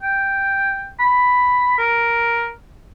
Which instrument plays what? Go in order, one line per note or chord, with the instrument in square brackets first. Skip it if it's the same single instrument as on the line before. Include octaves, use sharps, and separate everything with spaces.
[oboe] G5
B5
A#4